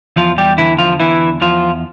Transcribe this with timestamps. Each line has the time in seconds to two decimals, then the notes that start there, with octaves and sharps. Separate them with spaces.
0.16 E2 F3 F4
0.38 G3 G4
0.58 D3 E3 E4
0.78 F3 F4
1.00 E2 E3 E4
1.41 E2 F3 F4